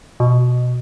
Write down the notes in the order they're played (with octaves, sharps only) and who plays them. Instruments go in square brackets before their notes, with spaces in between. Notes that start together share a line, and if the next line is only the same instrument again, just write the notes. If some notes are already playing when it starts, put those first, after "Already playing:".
[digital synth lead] B2